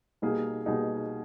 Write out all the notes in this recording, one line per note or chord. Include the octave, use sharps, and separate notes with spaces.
B2 G3 A#3 D#4 G#4
B2 G3 A#3 D#4 G#4